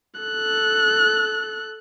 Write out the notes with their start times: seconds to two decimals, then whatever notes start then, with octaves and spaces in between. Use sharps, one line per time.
0.21 A4 F#6